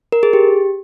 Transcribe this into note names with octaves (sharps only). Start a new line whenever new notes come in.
A#4
G#4
G4